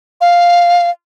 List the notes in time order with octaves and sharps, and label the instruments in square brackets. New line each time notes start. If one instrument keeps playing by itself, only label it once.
[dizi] F5